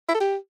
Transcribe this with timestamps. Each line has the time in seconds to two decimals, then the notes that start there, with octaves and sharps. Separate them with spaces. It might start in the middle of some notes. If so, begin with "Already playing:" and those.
0.09 E4
0.14 A4
0.20 G4